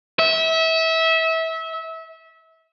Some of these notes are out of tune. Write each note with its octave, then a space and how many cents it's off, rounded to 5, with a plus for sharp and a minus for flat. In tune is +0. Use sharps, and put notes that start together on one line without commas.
E5 -25